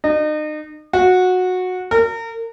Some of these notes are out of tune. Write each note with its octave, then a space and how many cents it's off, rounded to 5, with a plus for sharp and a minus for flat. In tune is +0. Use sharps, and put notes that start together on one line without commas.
D#4 -35
F#4 -15
A#4 -35